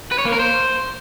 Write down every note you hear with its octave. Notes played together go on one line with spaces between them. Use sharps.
B4
C#5
A#3
A#4
C5